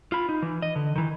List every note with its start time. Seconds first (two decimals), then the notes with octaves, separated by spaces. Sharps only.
0.12 F4 B5
0.29 D#4
0.42 E3
0.62 D#5
0.76 D3
0.96 D#3 E3